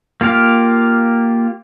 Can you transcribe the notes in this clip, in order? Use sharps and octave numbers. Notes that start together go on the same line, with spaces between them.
A#3 F4 G4 F5